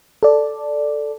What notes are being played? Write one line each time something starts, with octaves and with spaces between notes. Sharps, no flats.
A4 D5